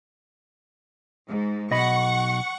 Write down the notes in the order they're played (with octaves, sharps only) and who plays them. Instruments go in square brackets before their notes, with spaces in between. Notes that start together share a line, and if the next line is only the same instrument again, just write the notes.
[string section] G#2
[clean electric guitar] B1 D#5 B5 [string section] F#5 C#6